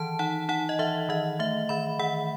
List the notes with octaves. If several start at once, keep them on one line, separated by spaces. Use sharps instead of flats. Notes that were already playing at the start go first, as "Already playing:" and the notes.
Already playing: D#3 E3 A5
D#4 F#5
D#4 F#5
D#5
E3 E5
D#3 D#5
A3 E5
D#3 B5
D#3 F#5